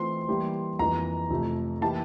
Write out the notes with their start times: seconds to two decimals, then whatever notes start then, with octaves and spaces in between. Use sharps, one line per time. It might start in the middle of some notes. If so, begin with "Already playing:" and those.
Already playing: E3 A3 C4 F4 C6
0.28 E3 G3 A#3 E4 G4
0.79 F2 E3 A#3 A#5
1.30 F2 C3 F3 A3
1.81 E3 A#3 E4 G4 A5